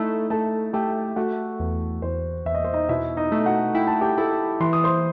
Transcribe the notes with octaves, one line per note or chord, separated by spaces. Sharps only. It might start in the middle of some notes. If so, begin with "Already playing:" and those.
Already playing: A3 D#4 E4 E5
A3 A4 A5
A3 G4 G5
A3 F#4 F#5
E2
E2 C5
E2 E5
D#5
C5
D#4 D#5
B2 E4 E5
D#4 D#5
A3
F#4 F#5
E4 G5
A5
G4 G5
E4 A4 A5
E3 C6
D#6
C5 C6